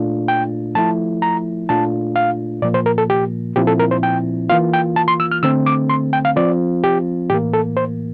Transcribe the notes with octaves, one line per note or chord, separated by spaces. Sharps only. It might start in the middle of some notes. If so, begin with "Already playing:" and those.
Already playing: A#2 A3 D4 F4
G5
F3 A3 E4 A5
A#5
A#2 A3 D4 F4 A5
F5
A#2 F3 A#3 D5
C5
A#4
A4
G4
A#2 F3 C4 E4 G4
A4
A#4
C5
G5
E3 A#3 F4 F5
G5
A5
C6
E6
F6
D3 A3 C4 E6
D6
C6
G5
F5
F3 C4 F4 D5
G4
A2 E3 A#3 G4
A4
C5